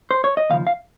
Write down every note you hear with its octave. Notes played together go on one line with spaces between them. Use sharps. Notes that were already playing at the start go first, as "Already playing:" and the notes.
C5
C#5
D#5
D#2 C#3 F3 F5
F5